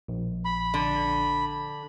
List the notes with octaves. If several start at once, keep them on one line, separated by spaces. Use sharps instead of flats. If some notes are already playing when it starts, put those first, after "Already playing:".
A#1
B5
D3